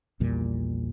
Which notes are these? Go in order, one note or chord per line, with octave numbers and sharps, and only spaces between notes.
A#1 E2 A#2 G3